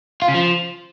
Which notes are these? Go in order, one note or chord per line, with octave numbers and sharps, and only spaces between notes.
F4
C#3
F3